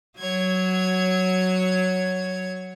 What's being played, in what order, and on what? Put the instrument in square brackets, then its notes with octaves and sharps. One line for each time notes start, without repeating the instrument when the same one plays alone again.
[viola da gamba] F#3 [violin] C#5 G#6